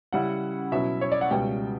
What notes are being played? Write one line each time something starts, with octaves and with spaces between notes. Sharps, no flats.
C#3 G3 C#4 E4 F#5
B2 F#3 C#4 E4 E5
C#5
D5
F#5
C#2 B2 G3 G5